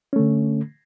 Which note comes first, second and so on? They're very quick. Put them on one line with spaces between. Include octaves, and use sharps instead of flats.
C#4 A3 D3